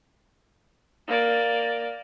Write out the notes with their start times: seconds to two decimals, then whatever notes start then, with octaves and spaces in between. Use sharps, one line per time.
1.07 A#3 D5